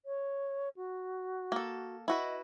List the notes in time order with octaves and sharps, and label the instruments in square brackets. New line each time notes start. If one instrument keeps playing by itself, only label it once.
[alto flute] C#5
F#4
[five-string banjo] A#3 A4
[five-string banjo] E4 F#4 B4 [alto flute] D#5